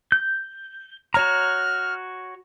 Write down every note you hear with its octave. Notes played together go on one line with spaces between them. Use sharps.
G6
F#4 C#5 A#5 F6